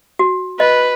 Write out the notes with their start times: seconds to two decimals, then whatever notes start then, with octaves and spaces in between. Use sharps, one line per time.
0.19 F#4
0.60 B4 D#5